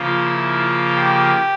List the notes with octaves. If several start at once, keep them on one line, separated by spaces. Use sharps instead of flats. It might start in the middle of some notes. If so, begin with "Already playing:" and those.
Already playing: C#3 F3 A#3 F4
E4
F4
G4